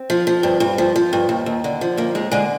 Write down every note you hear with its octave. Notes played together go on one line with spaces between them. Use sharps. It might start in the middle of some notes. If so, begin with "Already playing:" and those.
Already playing: C4
F3
F3
G2
G2
F3
F3
G2
D#2
D#2
D3
F3
D#2 A#3
D#2 G#3
D3 G#3